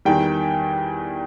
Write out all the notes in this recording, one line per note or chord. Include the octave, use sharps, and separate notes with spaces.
E2 D#3 G3 G5